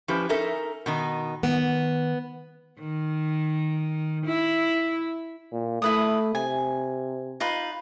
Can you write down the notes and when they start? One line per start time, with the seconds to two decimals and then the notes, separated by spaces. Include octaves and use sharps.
0.08 F3 C#4 E4 G4 B4
0.29 C#4 D#4 A4 A#4 E5
0.86 B2 D#3 D#4
1.43 D#3 B3
2.80 D#3
4.25 E4
5.53 A#2
5.82 A3 E4 B4 D#6
6.35 C3 G#5
7.40 D#4 F4 B4